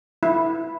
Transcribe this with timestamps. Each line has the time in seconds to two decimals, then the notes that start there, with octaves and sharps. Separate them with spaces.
0.23 E4